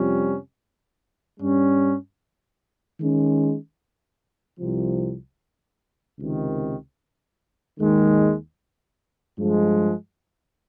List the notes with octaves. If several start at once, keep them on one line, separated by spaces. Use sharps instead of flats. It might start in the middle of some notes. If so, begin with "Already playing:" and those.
Already playing: F2 C3 G3 C#4 F4
G2 G3 C#4
D#3 G#3 C#4
C2 C3 F3
C#2 C3 D#3
D#2 D#3 G#3
G2 F3 G#3